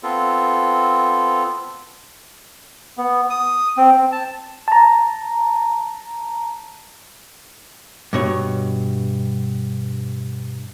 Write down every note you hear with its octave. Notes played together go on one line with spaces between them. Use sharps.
B3 C4 F4 A4
B3
D#6
C4
C4
A5
A5 A#5
G2 B2 C#5